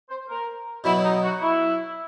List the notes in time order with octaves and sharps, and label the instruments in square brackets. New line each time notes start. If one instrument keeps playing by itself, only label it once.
[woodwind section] C5
A#4
[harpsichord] B2 F#3 B3 [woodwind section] E4
[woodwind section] D#4
F#4
E4